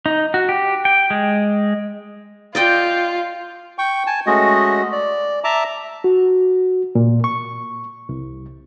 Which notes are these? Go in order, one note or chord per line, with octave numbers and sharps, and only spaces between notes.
D#4
F#4
G4
G5
G#3
F4 D5 D#5 G5
G5 C#6
G#5 A5
G#3 A3 C#4 F#4 D#5
D5
E5 A5 A#5 D6
F#4
A#2
C#6
C2